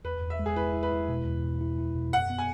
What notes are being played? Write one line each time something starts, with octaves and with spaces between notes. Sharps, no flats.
E2 B4
E2
E5
G#3
G#4
E4 B4
E4
B4
E4
B2
E2
B2
E4
E4
B2
F#2 F#5
B3
G#5